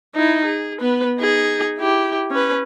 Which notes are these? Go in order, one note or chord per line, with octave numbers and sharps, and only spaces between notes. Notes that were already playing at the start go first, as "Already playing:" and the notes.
D#4 E4
G#4
B3 B4
D#4 G#4
E4 G4
C#4 B4